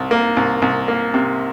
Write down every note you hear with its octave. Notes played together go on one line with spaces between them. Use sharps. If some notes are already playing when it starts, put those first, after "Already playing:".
Already playing: C2
A#3
C2
C2
A#3
C3